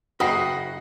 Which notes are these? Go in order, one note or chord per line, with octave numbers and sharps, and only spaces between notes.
F#1 F#4 D#5 F#5 G5 B5 C7